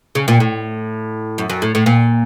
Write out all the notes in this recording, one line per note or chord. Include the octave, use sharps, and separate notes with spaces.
C#3
A#2
A2
F#2
F#2
A2
A2
A#2